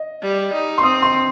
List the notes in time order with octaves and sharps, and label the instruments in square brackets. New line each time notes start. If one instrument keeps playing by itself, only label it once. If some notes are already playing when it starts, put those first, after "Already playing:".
Already playing: [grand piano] D#5
[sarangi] G3
D#4
[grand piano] C6
[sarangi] C4 [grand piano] D#6
[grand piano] C6